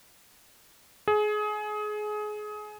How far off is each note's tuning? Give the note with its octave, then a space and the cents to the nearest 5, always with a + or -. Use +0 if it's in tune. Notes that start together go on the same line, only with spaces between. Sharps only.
G#4 +25